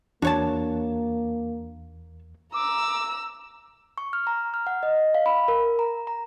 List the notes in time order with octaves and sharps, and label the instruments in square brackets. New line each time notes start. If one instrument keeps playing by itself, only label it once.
[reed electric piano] E2 [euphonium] A#3 [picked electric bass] D4 [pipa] F#4 C#5 A5
[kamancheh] A#5 E6 [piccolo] D6
[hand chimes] C#6
F6
A#5
F6
F#5
D#5
F5
B5
A#4
A#5
A#5